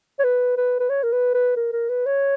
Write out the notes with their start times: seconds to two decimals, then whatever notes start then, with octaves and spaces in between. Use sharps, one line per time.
0.19 C#5
0.24 B4
0.57 B4
0.80 B4
0.90 C#5
1.03 A#4
1.12 B4
1.34 B4
1.57 A#4
1.72 A#4
1.89 B4
2.06 C#5